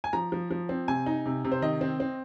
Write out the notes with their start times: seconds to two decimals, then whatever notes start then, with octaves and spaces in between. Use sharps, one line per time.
0.04 G#5
0.13 F3 A#5
0.32 F3
0.51 F3
0.69 C4
0.88 C3 G#5
1.06 D#4
1.26 C3
1.44 C3
1.52 C5
1.62 D#3 D#5
1.81 C4
2.00 C4